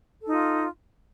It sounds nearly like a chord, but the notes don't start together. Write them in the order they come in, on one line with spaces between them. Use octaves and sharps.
A4 D#4 F4